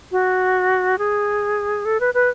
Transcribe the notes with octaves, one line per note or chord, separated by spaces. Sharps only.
F#4
G#4
A4
B4
B4